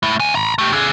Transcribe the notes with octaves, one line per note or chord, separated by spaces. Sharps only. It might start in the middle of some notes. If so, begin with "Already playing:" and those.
A3 E4
D2 G#5
A#5 B5
A3 G4
D3 G#4